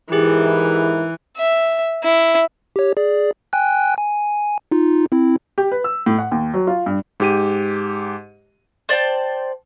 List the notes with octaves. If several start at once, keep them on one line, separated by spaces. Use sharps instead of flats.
G#2 E3 E4 G4 G#4 A#4
E5
E4
G4 C#5
G#4 D5
G5 G#5 F#6
G#5
D#4 F4
C4 E4
G4
B4
E6
A2
F#5
D#2
F#3
F4
G2
G#2 G4 D#7
C5 D5 G5 A5